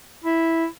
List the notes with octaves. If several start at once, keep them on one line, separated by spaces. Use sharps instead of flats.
E4